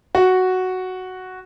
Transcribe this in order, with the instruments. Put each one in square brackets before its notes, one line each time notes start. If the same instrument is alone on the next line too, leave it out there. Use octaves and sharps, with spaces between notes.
[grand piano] F#4